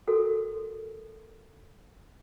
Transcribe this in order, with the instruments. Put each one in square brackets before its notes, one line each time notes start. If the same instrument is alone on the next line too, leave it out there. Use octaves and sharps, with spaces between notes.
[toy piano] F#4 A4 A#4